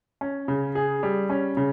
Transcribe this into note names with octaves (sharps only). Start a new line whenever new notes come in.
C#4
C#3
G#4
G3
C#4
C#3